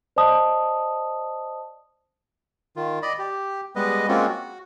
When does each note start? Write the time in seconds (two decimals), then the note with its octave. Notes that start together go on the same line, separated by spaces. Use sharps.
0.16 C5 D5 D#5 A5 D#6
2.76 D#3 F4
3.02 D5 D#5 B5
3.19 G4
3.76 G3 G#3 B3 B4 D#5
4.08 G#3 A#3 C4 C#4 F4 F#4
4.29 F#4